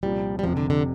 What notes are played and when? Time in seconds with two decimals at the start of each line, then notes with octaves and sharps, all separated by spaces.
0.03 C2 A#2 F3 G3
0.39 G3
0.43 F1 F2 C3 F3
0.57 D3
0.70 D3